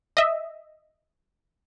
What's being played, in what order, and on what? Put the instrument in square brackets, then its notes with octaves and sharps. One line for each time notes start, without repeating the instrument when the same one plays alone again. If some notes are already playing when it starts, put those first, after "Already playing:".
[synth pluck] D#5 E5